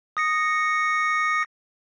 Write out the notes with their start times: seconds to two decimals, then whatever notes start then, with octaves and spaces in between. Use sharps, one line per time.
0.17 D#6 A#6 C#7